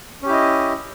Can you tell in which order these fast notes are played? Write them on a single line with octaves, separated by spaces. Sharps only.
C#4 G4 E4 D#5